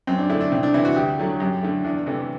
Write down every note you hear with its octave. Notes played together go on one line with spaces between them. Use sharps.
F#2 C4
D4
D3 A3 E4
D4
C2 C4
D4
C3 E3 E4
F#4
D2 G4
D3 F#3 A3
F#2 G4
D3 A3
E2 D4
C3 E3 A3